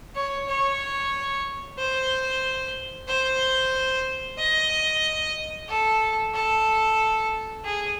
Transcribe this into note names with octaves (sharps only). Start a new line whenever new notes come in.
C#5
C#5
C5
C5
D#5
A4
A4
G#4